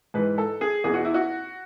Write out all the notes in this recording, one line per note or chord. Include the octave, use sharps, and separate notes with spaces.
G#2 E3 B4
A4
G#4
E2 G#4
B2 F#4
E4
F#4